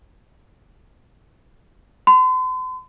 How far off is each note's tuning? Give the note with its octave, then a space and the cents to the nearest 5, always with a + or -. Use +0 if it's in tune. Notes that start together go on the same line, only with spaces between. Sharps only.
C6 -45